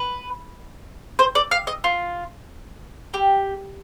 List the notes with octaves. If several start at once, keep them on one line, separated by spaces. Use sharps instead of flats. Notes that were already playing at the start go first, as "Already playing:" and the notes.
Already playing: B4
C5
D5
F5
D#5
F4
G4